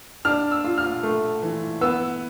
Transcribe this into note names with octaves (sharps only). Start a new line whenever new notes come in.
D4 F6
E6
F4
F6
A3
E3
B3 E6